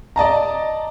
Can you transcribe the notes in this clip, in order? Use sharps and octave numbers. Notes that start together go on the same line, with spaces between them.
D5 D#5 A5 A#5